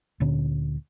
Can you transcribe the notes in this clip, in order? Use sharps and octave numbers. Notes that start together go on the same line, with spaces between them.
D2 A#2 D3 C#4